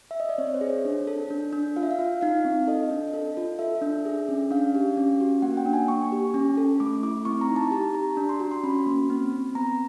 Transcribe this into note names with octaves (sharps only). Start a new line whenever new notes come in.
E5
D#5
D5
C4 C#5
C5
G#4
C#5
D4
A4
D4
D4
F4 F5
E5
F5
F4
D#4 F5
C4
A4 D#5
D4
A4
F4
A4 E5
D4
G#4
C#4
D4 F5
G4
C#4
F#4
A#3 F#5
G5
D4
G#5
A#3 C#6
G4
C#4
A4
A3 D6
E4 D6
C4 C#6
A#5
D#4
A5
G4 A5
G4 A#5
D4
C6
F#4
C6
C#4 B5
A#3
C4
C4
B3 A#5